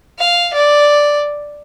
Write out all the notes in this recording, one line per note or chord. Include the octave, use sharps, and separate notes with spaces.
F5
D5